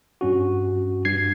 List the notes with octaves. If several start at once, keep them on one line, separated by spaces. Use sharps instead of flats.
G2 C#4 F#4
G2 G#6 C7